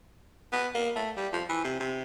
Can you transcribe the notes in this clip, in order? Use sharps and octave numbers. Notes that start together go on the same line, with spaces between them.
B3
A#3
A3
G3
F3
E3
C3
C3